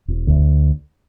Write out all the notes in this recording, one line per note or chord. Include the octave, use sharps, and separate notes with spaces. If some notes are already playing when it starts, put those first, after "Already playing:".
E1
D2